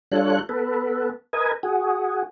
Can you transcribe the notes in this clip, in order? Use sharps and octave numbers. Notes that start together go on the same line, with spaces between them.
G3 D4 F4 A4 C#5 F#6
B3 A4 B4
A#4 B4 D#5 G#5
F#4 G#4